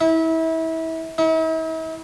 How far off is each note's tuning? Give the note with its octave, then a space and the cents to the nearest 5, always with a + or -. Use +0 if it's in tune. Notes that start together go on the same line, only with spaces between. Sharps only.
E4 -30
E4 -45